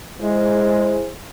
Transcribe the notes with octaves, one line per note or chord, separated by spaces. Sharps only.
G#3 E4 G#4 C5